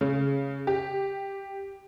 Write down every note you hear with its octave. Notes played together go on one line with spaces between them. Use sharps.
C#3
G4